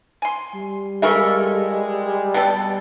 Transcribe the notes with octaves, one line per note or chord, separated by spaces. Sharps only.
G#5 C6
G3
C#3 E3 G#3 A4 A#4 E5 C#6
B2 B3 A4 D5 G5